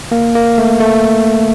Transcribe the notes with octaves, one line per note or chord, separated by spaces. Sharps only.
A#3
A#3
A3
A3